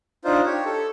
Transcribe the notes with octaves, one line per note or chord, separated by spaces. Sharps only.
D4 D#4 F4 C5
G4 C#5
A4